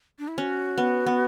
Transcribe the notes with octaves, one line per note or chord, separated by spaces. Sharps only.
D4
E4
C#4 F#4
B3
B3